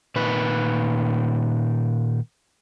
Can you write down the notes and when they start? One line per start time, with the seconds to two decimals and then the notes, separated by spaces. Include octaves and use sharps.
0.16 A#2 D#3 B4